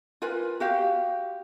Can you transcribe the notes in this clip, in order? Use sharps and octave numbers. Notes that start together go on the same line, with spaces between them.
F4 A#4 B4 G#5
F#4 G4 F5